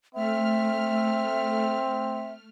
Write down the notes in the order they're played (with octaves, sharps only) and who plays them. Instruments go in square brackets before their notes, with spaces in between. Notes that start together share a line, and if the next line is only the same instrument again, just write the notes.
[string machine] A3 F6 [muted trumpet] C4 [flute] E5